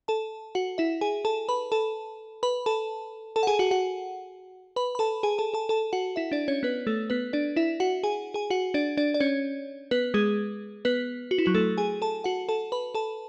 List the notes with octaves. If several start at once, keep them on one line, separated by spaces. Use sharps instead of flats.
A4 A5
F#4 F#5
E4 E5
G#4 G#5
A4 A5
B4 B5
A4 A5
B4 B5
A4 A5
A4 A5
F#5
G#4 G#5
F#4 F#5
F#4 F#5
B4 B5
B5
A4 A5
G#4 G#5
A4 A5
A4 A5
A4 A5
F#4 F#5
E4 E5
D4 D5
C#4 C#5
B3 B4
A3 A4
B3 B4
D4 D5
E4 E5
F#4 F#5
G#4 G#5
G#4 G#5
F#4 F#5
D4 D5
D4 D5
D5
C#4 C#5
B3 B4
G#3 G#4
B3 B4
F#4
E4
F#3 F#4
A3 A4
G#4 G#5
A4 A5
F#4 F#5
A4 A5
B4 B5
A4 A5